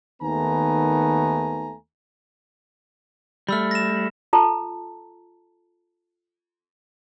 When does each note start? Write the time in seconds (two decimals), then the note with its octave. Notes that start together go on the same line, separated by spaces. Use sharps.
0.23 D#2 D#3 A3 B3 G#5 A#5
3.49 G3 A3 B5 E6 F6
3.71 A#6 E7
4.33 F4 A4 A5 A#5